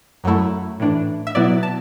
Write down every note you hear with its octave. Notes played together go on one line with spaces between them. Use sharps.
F#2 F#3 A3 E4
A2 E3 D4
E5
B2 F#3 B3 E4 D5
A5